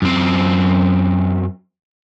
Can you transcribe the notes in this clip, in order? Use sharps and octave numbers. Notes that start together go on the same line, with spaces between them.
F#2 C4